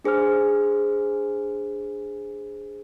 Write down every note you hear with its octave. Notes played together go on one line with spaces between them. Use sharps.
D4 G#4 C5 G#5 F6